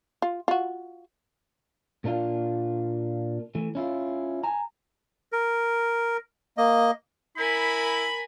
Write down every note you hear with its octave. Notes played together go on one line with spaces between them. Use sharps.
F4
F4 F#4
A#2 A#3 D4 F4 F5
E3 A3
C#4 E4 F4
G#5 A#5
A#4
A#3 D#5
E4 A#4 G#5 B5